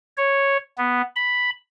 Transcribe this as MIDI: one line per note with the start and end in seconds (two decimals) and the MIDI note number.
0.17 0.57 73
0.78 1.02 59
1.16 1.50 83